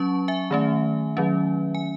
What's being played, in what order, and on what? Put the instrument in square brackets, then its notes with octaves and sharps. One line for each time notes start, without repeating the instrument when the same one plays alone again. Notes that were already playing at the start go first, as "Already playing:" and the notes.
Already playing: [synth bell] F#3 C#4 A5 C#6
E5 G#5
D#3 A3 C#4
D#3 F#3 C#4
G#5